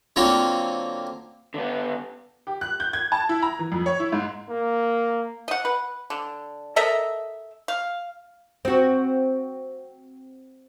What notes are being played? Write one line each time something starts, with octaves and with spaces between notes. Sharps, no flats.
D3 F#3 A#3 C4 F4 C#5
D3 B3
G4
F#6
G6
G#6
A5
E4
A#5
E3
F2
C#5
E4
G#2
A#3
D#5 F#5
B4
D3
A4 A#4 D#5 E5
F5
C4 F#4